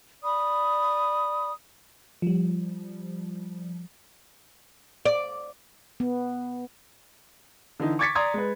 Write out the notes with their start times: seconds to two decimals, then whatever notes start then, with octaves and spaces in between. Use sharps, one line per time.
0.22 D5 B5 D#6
2.22 F3 G3
5.05 D5
6.00 B3
7.80 D3 E3 D#4
7.99 C#6 D6 G#6 A6 B6 C#7
8.15 D5 A#5 C6 D#6 G#6
8.34 G#3 B4